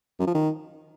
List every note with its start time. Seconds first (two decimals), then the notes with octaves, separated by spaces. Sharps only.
0.19 F#2
0.27 F3
0.35 D#3